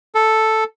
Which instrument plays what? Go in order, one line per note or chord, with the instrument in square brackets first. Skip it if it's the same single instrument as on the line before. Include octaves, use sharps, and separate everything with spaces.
[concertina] A4